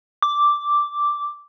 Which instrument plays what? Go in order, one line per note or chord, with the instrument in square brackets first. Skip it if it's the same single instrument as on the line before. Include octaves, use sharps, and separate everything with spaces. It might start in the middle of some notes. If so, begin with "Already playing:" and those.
[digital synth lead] D6